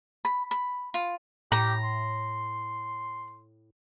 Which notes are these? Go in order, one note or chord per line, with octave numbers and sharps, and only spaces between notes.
B5
B5
F4
A2 G4 A#5
C6